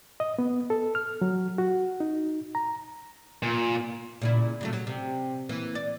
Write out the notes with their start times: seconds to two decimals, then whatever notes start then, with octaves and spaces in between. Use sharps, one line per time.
0.20 D#5
0.39 B3
0.70 A4
0.95 F6
1.22 F#3
1.58 F#4
2.00 D#4
2.55 A#5
3.43 A#2
4.22 A#2 C#3 E4
4.61 C#3 F#3 A3
4.73 F#3
4.87 C3
5.49 E3 A#3
5.75 D5